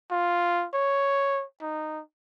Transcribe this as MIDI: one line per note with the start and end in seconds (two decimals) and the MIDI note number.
0.11 0.66 65
0.74 1.44 73
1.61 2.01 63